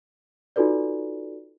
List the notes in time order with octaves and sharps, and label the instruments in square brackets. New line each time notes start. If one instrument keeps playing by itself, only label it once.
[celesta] D#4 F4 F#4 A4 B4 D5